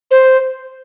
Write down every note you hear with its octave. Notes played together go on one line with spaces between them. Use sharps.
C5